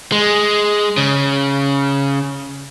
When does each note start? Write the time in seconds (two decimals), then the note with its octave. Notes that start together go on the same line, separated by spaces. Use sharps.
0.12 G#3
0.97 C#3